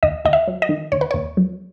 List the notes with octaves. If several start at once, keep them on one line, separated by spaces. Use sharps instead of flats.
D#2 D#5
D#2 D#5
E5
F#3
D#5
D#3
D#2 C#5
B4
D#2 C#5
F#3